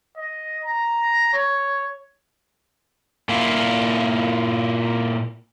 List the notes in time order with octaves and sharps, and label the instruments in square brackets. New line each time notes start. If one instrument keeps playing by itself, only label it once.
[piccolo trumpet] D#5
A#5
C#5
[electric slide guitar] A#2 A#3 E4 F4